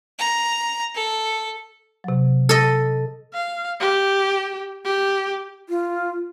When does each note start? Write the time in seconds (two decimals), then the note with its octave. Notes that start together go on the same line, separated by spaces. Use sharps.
0.19 A#5
0.95 A4
2.04 C3 F#3
2.49 A4 D#5
3.34 F5
3.80 G4
4.85 G4
5.69 F4